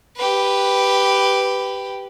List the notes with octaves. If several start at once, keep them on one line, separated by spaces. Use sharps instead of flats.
G4 B4